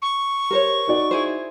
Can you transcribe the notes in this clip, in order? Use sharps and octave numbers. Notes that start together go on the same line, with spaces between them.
C#6
G4 A#4 C5 C#5
D#4 F#4 D5
E4 G#4 C5